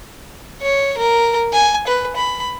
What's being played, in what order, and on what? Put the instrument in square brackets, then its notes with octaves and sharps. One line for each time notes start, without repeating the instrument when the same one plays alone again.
[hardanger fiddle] C#5
A#4
G#5
B4
B5